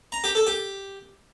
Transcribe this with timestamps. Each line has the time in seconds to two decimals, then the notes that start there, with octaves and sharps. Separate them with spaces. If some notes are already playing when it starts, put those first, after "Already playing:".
0.12 A#5
0.24 G4
0.35 A4
0.47 G4